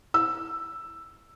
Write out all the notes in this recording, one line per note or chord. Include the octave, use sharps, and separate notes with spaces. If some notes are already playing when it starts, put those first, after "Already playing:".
E6